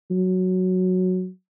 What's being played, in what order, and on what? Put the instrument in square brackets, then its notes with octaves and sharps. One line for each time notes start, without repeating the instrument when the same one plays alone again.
[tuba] F#3